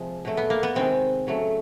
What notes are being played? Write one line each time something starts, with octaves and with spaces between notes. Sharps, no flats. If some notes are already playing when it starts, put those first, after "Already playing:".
Already playing: C3 F3 G#3
B2 F#3 A3
B3
A#3
B3
C3 D#3 G#3 C4
C#3 F#3 A3